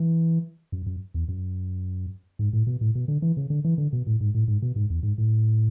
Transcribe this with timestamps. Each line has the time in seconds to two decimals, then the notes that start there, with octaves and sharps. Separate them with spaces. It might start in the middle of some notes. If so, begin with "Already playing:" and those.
Already playing: E3
0.72 F#2
0.86 F#2
1.14 E2
1.28 F#2
2.39 G#2
2.53 A2
2.67 B2
2.81 A2
2.95 B2
3.08 D3
3.22 E3
3.37 C#3
3.50 D3
3.64 E3
3.78 D3
3.93 B2
4.07 A2
4.21 G#2
4.34 A2
4.48 G#2
4.62 B2
4.76 G#2
4.90 E2
5.03 G#2
5.18 A2